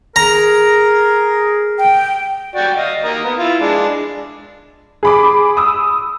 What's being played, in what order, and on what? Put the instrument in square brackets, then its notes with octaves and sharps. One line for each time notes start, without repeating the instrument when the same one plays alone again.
[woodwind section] G#4 [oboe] A#4 [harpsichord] A#5
[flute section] G5
[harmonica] F#4 D5 G5
D#5 F5
A#3 A#4 D#6
B3 D#6
E4 F4
G#3 D4
[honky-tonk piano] G#4 B5 D6
D#6 E6